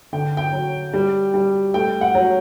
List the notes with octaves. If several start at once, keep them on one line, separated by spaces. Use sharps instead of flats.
D3 G5
G5
F#3
G3
G3
A3 G5
F#5
F#3